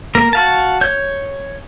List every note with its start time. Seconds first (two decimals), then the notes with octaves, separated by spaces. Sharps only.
0.15 A#3 A#4 A#5
0.33 F#4 F5 A5
0.81 C#5 G6